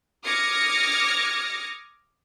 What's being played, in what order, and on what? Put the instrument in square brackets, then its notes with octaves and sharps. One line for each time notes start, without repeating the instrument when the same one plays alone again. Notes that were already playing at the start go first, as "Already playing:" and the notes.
[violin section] D6 D#6 F6 G#6 A#6 C#7